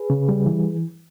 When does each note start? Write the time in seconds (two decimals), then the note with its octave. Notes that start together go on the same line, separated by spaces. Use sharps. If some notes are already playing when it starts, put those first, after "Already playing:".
Already playing: G#4 B4
0.10 C#3
0.29 G3
0.46 E3